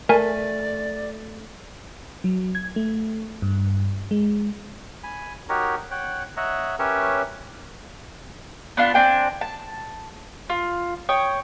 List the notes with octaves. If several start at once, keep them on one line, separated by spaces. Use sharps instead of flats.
A3 A#4 D5 G#5
F#3
G#6
A3
G2
G#3
G#5 B5
D#4 F#4 G4 A#4 C#5 A#5
C#5 F#5 G5
C#5 D#5 E5 F#5 A#5
C#4 G4 A#4 B4 C#5 E5
B3 D4 F4
C4 D4 G5 G#5
A5
F4
C#5 G5 D#6